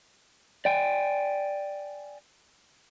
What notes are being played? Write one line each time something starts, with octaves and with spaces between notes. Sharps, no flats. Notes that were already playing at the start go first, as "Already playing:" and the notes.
D5 G5 G#5